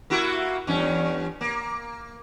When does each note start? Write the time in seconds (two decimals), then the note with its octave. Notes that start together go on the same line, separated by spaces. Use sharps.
0.10 A#3 E4 F#4
0.67 E2 G2 C#4
1.41 A#3